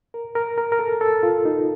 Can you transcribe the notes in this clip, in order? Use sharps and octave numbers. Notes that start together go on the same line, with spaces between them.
A#4
A#4
A#4
A#4
A4
A4
F4
D#4